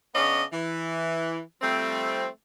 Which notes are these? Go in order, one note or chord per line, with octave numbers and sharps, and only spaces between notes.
C#3 B3 C#4 D4 C#5 D#5
E3
F3 G3 A3 C4